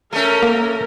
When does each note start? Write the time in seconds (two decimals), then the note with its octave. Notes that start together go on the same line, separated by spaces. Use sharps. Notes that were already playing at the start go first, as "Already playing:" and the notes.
0.13 A3 C#4 A#4
0.43 A#3